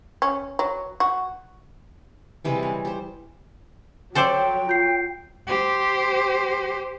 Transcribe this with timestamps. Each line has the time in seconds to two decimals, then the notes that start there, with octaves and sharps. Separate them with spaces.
0.22 C#4
0.59 F#3
1.00 F#4
2.45 C3 E3 G3 G#3
2.63 C#5
2.85 G4 C5
4.15 F#3 A4 C5 D5 G5
4.67 F4 G6 C7
5.47 G4 C5